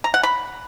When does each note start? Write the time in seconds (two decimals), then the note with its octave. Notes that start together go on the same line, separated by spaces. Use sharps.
0.04 A#5
0.14 F#5
0.23 B5